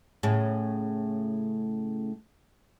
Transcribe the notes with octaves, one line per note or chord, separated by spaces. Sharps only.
A2 C#3